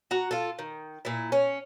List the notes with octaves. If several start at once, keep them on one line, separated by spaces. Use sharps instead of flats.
F#4 A#5
F4 A4
D#3
A#2 E4
C#4